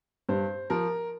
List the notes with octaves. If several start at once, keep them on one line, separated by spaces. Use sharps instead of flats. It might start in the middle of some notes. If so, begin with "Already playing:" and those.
G2 C5
F3 A#4